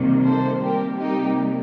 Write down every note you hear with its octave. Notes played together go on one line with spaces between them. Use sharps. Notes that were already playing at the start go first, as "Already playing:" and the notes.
Already playing: C3 D#3 G3 A#3
A4 C5
C3 G3 A#3 G4 A#4
D#4 G4